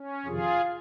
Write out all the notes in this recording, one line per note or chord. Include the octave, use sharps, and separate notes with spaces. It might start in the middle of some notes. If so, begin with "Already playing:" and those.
Already playing: C#4
F2 C3 D#3 F4 G#4